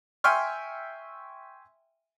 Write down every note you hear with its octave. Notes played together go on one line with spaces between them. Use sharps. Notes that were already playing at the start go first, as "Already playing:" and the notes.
E5 G5 G#5 C6 C#6 F6